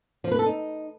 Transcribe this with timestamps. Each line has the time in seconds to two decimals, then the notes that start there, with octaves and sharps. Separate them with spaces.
0.24 F3
0.31 B4
0.39 A4
0.46 D#4